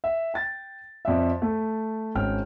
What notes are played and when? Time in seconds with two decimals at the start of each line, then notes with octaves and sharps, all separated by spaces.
0.04 E5
0.34 G5 A6
1.05 F2 D5 E5
1.42 A3
2.15 G#1 C#4 G5 F6